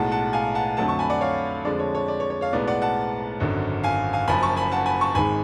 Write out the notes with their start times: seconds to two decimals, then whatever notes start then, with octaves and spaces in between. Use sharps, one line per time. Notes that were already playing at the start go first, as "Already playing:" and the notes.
Already playing: B1 A2 G#3 F#5 A5
0.12 F#5 A5
0.33 F5 G#5
0.55 F#5 A5
0.77 F2 D3 F#3 A3 F#5 A5
0.88 A5 C#6
0.99 G#5 B5
1.10 D5 F#5
1.21 C#5 F5
1.65 F2 D3 F3 G#3 D5
1.79 C#5
1.95 C#5
2.08 D5
2.20 C#5
2.30 C#5
2.41 C#5 F5
2.53 B1 A2 G#3 B3 D5
2.67 D5 F#5
2.82 F#5 A5
3.40 G#1 F#2 D3
3.83 F5 G#5
4.13 F5 G#5
4.28 F#1 F#2 F3 G#5 B5
4.43 A5 C#6
4.57 G#5 B5
4.72 F#5 A5
4.86 G#5 B5
5.01 A5 C#6
5.15 G#1 G#2 G#3 G#5 B5